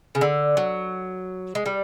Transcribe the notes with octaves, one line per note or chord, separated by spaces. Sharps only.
C#3
D3
F#3
G#3
G3